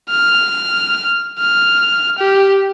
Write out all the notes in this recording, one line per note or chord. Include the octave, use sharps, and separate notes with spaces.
F6
F6
G4